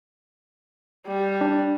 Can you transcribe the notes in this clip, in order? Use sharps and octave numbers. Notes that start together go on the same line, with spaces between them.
G3
D4